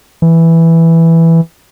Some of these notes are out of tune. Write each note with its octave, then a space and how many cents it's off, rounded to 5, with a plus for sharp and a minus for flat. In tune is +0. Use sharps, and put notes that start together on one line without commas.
E3 +0